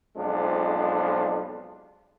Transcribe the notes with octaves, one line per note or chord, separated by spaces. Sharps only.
B1 F2 F3 G#3 D4